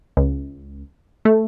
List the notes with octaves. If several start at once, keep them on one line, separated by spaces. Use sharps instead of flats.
C#2
A3